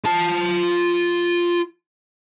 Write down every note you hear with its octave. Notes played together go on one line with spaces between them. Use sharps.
F4 A5